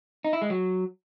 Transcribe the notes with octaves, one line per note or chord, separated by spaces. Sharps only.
D#4
E4
G#3
F#3